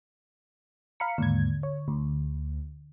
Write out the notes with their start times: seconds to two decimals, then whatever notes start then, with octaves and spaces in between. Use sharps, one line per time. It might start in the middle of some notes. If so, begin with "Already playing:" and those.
1.00 F5 A#5 B5 C#7
1.18 D#2 G#2 D3 G#6
1.63 C#5
1.88 D2